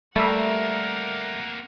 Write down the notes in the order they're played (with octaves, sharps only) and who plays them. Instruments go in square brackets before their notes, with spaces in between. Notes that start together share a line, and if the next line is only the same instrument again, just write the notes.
[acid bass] G3 [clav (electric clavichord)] A3 E5 [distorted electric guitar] A#3 C4 [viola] A#4 F#5